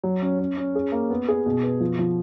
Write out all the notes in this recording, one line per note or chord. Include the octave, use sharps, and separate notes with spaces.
F#3
C#4
C#4
C#4
G#4
A#3
B3
G#4
B2
B4
F3
F3